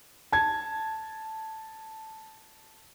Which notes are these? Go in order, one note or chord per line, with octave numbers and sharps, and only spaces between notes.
A5 G#6